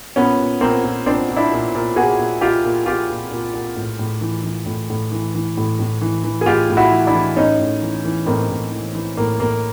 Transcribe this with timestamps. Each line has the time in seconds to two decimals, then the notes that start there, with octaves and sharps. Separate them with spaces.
0.16 A#2 B3 C#4
0.40 A#2
0.61 A#2 A#3 C4
0.84 A#2
1.06 A#2 C4 D4
1.29 A#2
1.36 D4 E4
1.52 A#2
1.75 A#2
1.96 A#2 F#4 G#4
2.19 A#2
2.41 A#2 F4 G4
2.64 A#2
2.86 A#2 F4 G4
3.10 A#2
3.31 A#2
3.54 A#2
3.76 A2
3.99 A2
4.21 E3
4.44 E3
4.66 A2
4.90 A2
5.12 E3
5.35 E3
5.57 A2
5.79 A2
6.02 E3
6.24 E3
6.41 G#4
6.46 A2 F4 G4
6.70 A2
6.77 E4 F#4
6.91 E3
7.07 D4 E4
7.14 E3
7.36 A2 C#4 D#4
7.59 A2
7.82 E3
8.05 E3
8.26 A2 A#3 C4
8.50 A2
8.71 E3
8.95 E3
9.17 A2 A#3
9.40 A2 A#3